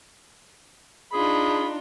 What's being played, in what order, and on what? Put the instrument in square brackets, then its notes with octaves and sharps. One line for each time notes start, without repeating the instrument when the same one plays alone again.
[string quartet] D4 D#4 F4 [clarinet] G#4 [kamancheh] B5